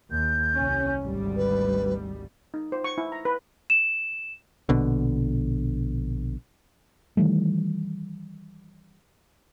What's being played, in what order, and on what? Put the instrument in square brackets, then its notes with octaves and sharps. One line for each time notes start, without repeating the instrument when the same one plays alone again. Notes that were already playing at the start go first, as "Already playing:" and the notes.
[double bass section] D#2 [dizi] G6
[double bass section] C2 C#4
G#1 D2 G3
[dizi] B4
[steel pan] D#4
C5
C#6
E4
A#5
B4
[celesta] E7
[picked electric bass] A#1 B2 D3
[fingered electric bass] D#3 E3 G3 A3